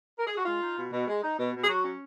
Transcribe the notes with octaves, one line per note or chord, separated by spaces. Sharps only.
A#4
G#4
F#4
G#3 F4
D#4
B2
B2
G#3
D#4
B2
B2
G#4
F#3 F#4
C#4